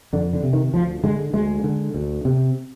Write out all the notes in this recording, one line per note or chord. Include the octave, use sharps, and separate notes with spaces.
F2 D3
D3
C3
D#3
D2 F3
D3 G#3
D2 G#3
D3
D2
C3